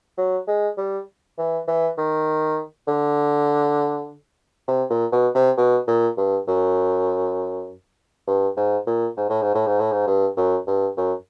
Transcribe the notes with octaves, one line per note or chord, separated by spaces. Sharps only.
F#3
G#3
G3
E3
E3
D#3
D3
C3
A#2
B2
C3
B2
A#2
G2
F#2
G2
G#2
A#2
G#2
A2
G#2
A2
G#2
A2
G#2
G2
F#2
G2
F#2